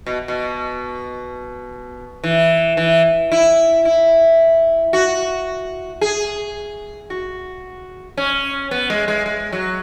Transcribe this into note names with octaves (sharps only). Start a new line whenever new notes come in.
B2
B2
E3
E3
E4
E4
F#4
G#4
F#4
C#4
B3
G#3
G#3
G#3
F#3